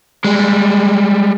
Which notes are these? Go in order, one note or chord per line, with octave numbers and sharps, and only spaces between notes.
G3 G#3